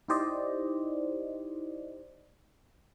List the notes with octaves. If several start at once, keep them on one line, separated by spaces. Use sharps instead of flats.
D#4 E4 G4 C5 D5 D#5